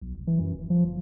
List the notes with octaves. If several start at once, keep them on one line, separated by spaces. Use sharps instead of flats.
B1
F1
E3
F#2
D1
F3
G1